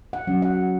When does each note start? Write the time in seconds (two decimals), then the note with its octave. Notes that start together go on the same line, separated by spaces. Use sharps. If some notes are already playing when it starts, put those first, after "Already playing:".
0.13 F#5
0.27 F#3 C#4
0.42 F#5